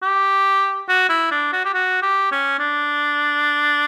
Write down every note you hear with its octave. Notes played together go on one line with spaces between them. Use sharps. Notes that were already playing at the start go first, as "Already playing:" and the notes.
G4
F#4
E4
D4
F#4
G4
F#4
G4
C#4
D4